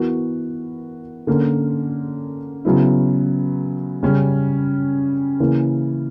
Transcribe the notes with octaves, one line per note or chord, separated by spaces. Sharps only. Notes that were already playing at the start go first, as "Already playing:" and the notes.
Already playing: E3 B3 F#4 A#4
D3 A#3 C#4
C#3 F#3 B3 E4
C#3 G3 C#4
C#3 E3 A#3 C#4